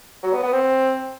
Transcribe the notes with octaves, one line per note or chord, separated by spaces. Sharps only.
F#3
B3
B3
C4